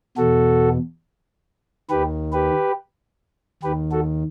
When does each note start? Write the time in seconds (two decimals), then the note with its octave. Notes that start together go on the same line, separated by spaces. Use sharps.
0.17 E2 B2 F#4 A4
1.90 D#2 D#3 G4 B4
2.33 G4 B4
3.63 D#2 D#3 G4 B4
3.91 F#4 A4